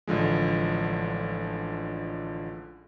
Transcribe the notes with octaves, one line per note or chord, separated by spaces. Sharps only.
A1 D3 F3 G#3